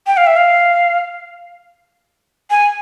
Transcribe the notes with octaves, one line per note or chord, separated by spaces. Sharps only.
G5
F5
E5
F5
G#5